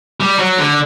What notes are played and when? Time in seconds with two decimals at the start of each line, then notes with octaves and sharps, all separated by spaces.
0.20 G3
0.39 F#3
0.58 D3